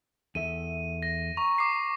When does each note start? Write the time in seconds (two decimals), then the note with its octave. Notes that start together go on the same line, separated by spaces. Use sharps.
0.35 E2 A4 E5 D#7
1.03 A#6
1.37 A#5 C#6
1.58 D6 C7